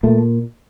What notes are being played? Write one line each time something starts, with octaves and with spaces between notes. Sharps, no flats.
A#2 A3